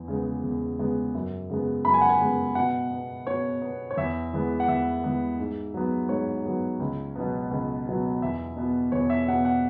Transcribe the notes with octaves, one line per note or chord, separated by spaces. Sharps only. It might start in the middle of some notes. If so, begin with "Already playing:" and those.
Already playing: E2
C#3 G#3 B3
E2
C#3 G#3 B3
F#2
C#3 G#3 B3
F#2 B5
G#5
F#5
G#5
C#3 G#3 B3
B2 F#5
B3
B2 C#5
B3
C#5
E2 E5
E3 G#3 B3
F#5
E2 E5
E3 G#3 B3
G#2
F#3 B3
G#2 C#5
F#3 B3
C#2
B2 F#3 B3
C#2
B2 F#3 B3
E2 E5
B2 B3
E2 C#5
E5
B2 B3 F#5
F#5